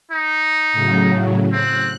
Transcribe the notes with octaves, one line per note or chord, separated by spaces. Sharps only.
D#4
A2 C#3 F#3
C4 F#6